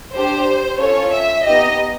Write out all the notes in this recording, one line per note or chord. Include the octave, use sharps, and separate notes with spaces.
D4 G4 C5
C#4 F4 A4 C#5
E5
B3 D#4 G4 D#5